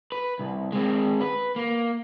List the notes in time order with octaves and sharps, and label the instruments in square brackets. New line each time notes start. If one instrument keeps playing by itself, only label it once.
[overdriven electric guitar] B4
C2
G#3 C4
B4
A#3